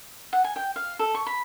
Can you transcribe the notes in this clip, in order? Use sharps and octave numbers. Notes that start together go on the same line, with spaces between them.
F#5
G#5
G5
F5
A4
C#6
B5